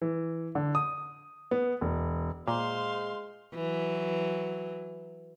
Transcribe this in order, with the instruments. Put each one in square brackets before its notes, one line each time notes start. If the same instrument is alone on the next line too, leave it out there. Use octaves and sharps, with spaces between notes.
[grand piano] E3
D3
D#6
B3
E1
[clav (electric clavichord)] A#2 [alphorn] G#3 [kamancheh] C5 C6 [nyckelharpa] F5
[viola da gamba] E3 F#3